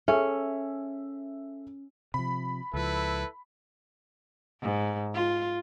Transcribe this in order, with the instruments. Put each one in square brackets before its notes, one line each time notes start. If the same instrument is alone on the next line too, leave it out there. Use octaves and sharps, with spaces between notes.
[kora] C#4 [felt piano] G#4 A4 E5
[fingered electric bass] C3 F3 [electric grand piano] B5
[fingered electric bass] C#2 F3 [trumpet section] E4 A4 B4
[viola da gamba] G#2
F4